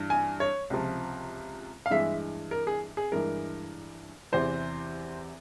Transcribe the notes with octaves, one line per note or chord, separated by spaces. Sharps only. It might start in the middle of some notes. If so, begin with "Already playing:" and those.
Already playing: G2 E3 G3
G#5
C#5
C#2 C3 F3
F5
G2 E3 G#3 E5
A#4
G#4
G#4
G2 E3 G#3 A#4
E2 C3 E3 C5